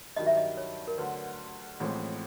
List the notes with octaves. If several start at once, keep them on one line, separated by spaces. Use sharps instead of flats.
G2 D#3 F#3 D#5
E5
D#5
C#5
A#4
D2 D3 F#3 B4
A1 A2 F3 G#3 C4